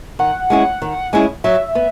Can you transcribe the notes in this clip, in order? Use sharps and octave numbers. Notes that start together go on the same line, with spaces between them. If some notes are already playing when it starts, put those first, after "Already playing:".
D#3 F#5
G#3 C#4 E4 G#4
D#3
G#3 C#4 E4 G#4
F#3 E5
B3